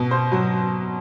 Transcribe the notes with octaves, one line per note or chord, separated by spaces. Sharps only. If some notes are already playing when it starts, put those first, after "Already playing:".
Already playing: B2
C5
F#3